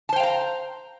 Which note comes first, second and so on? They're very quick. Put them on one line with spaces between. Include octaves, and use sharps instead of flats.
A5 C5 G5 F5 A#5